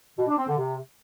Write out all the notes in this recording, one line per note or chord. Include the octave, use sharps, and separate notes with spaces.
B2
D4
C4
D3
C3